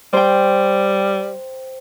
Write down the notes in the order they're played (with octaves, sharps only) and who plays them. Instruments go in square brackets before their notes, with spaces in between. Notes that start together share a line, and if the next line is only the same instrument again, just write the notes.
[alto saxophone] G3 [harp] C5 G5